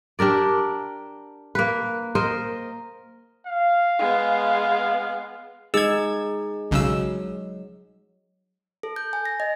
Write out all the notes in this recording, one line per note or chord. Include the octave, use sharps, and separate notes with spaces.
D4 G4 A#4 D5
A#3 B4
A#4 C5 D#5
F5
G#3 B3
G#3 D#4 G#4 E6 G#6
B1 C#3 F#3 G#3 E6
A4
G6
G#5
A#6
D#5